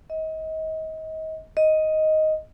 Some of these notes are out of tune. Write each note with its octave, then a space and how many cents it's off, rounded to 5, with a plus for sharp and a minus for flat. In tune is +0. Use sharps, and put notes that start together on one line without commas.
D#5 +30
D#5 +5